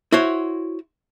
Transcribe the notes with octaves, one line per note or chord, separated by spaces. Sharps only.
E4 F#4 C5 C#5